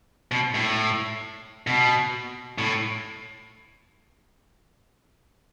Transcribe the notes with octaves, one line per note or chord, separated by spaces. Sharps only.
B2
A2
B2
A2